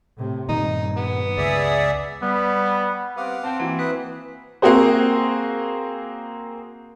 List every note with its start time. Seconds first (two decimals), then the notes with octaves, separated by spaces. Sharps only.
0.18 A2 C3
0.49 G2 A#2 D#3 G3 D#4
0.97 B3
1.38 C#2 G#4 D5 E5
2.22 G3 B3
3.17 C4 G4 B4 F5 F#5 D6
3.43 C4 G5 A5
3.60 E3 A#3 F#4
3.79 E4 B4 D#6 F#6
4.62 A#3 C4 F#4 G#4 C5